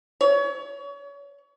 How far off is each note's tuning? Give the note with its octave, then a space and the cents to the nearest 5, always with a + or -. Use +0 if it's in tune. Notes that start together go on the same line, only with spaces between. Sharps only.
C#5 +35